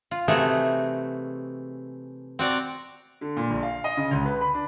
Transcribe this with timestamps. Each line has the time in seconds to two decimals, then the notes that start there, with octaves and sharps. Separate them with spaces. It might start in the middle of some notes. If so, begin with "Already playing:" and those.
0.11 F4
0.28 C3 E3 A3 D#4 F#4 G#4
2.39 C4 F#4 D5 A#5
3.21 D3
3.37 A#2
3.50 A#1
3.63 F5
3.84 D#5
3.97 C#3
4.11 C#2
4.25 B4
4.41 B5
4.54 D4